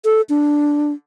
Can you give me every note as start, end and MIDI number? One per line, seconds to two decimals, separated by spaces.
0.05 0.21 69
0.29 0.93 62